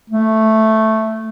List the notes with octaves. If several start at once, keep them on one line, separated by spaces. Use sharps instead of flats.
A3